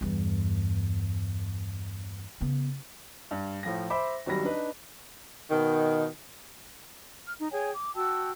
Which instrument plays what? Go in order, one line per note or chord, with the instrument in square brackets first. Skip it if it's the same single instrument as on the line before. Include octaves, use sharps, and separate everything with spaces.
[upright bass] E2 G2
C#3 B3
[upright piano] G2
A2 F3 A#6
C5 E5 B5 D6
G#1 F#3 G3 B5 A#6
D4 D#4 B4
[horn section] B2 D#3
[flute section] F6
D#4
G#4 C#5 G5 G#5
D6
F#4 G5 A5 E6